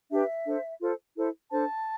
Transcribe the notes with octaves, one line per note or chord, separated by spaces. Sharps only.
D4 G4 B4 E5
D4 A4 C5
F4 A4 C5
E4 A4 C5
D4 A4 C5 A5